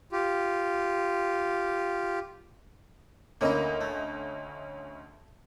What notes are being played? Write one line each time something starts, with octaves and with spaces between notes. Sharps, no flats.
F4 G4
D2 A#3 C#4 E4 D#5
A3